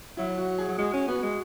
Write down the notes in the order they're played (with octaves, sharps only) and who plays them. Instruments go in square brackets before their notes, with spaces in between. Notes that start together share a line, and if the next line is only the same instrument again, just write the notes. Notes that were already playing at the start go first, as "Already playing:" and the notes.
[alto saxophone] F#3 [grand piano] E4
[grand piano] F#4
G#4
[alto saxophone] F#3
[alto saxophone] G#3 [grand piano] F#4
[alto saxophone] C#4
[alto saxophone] B3 [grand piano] F#4
[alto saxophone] G#3